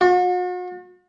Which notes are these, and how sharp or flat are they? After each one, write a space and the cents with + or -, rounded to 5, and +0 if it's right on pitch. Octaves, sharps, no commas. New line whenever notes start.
F#4 -45